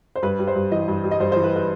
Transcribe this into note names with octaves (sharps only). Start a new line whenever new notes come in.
C5
G2 B4
G3
C5
G2
E3 D#5
G2
G3
D#5
G2 C5
E3 C5
B4
B4